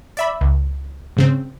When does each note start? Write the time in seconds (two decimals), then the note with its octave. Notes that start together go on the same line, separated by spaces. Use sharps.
0.17 D5 E5 B5
0.41 C#2
1.17 G#2 C#3 C4